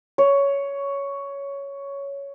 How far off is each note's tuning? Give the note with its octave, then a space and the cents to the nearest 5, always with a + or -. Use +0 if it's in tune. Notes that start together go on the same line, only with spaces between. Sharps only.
C#5 +10